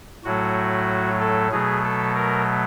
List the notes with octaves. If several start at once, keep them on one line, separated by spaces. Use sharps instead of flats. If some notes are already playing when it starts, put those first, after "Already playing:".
A2 F#3 A3 F#4
A4
B2 F#3 A3 G#4
A4
A#4